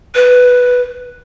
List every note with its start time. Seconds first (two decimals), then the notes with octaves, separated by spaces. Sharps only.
0.15 B4